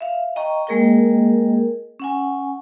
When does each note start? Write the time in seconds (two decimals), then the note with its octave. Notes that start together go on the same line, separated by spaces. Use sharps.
0.01 E5 F5
0.36 D#5 G5 A#5 C#6
0.67 G#3 A#3 G#4 A#4 D#5 G5
2.00 C#4 F#5 G#5